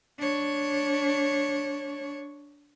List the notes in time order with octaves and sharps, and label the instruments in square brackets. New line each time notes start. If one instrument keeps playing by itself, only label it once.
[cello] D4 C#5